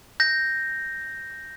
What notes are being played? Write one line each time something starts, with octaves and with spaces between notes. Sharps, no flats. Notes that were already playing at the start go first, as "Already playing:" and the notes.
G6 A#6